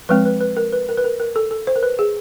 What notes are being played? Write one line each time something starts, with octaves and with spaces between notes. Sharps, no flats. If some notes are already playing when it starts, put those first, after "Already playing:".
F3 G#3 C4 B4
B4
B4
A#4
B4
A#4
B4
A#4
A#4
A4
A4
C5
A#4
B4
G#4